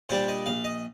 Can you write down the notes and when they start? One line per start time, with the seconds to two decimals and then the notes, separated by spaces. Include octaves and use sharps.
0.09 A#2 G3 D4 C5
0.28 D#5
0.46 A#1 F5
0.64 D#5